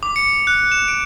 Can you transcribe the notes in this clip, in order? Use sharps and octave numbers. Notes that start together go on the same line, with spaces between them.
D6
C#7
F#6
E7
D7